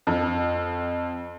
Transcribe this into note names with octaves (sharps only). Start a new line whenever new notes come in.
F2